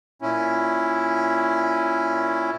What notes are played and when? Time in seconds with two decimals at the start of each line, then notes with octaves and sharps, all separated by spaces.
0.22 A#2 C#4 E4